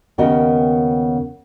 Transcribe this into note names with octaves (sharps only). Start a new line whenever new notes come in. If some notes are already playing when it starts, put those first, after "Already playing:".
D#2 C#3 B3 A#4 D#5 G5